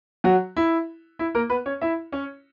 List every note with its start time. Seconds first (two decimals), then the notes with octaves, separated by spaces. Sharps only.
0.24 F#3 F#4
0.57 E4
1.19 E4
1.35 A#3 A#4
1.50 B3 B4
1.66 C#4 C#5
1.81 E4 E5
2.12 C#4 C#5